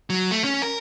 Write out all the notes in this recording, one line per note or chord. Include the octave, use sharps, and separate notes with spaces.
F#3
A3
C#4
A#4